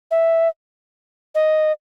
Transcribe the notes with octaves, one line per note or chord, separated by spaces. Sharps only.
E5
D#5